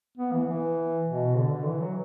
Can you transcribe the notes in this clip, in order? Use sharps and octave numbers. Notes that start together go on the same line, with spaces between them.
B3
E3
E3
B2
D3
D3
E3
F#3